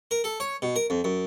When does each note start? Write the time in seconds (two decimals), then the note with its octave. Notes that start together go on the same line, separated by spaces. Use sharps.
0.11 A#4
0.24 A4
0.40 C#5
0.62 B2
0.76 A#4
0.90 F2
1.04 F#2